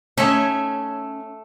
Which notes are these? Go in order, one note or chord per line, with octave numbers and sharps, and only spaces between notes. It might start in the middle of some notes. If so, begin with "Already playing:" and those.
A3 C#4 D#4 E5